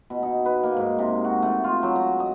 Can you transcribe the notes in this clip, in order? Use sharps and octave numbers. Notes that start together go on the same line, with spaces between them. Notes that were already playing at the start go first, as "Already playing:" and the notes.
B2
D#4
B4
A#3
G#2
C3
F#4
A3
F4
F#3
A#5
D#5